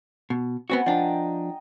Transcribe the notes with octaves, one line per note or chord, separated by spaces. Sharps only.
B2
B3 C4 F#4 F#5 G#5
F3 D4 D#5 G5 A#5